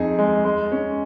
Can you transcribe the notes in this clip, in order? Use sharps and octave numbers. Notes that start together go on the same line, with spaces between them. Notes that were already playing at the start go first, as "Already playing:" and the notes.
Already playing: F2 D#4 G#4
G#3
G#3
C#4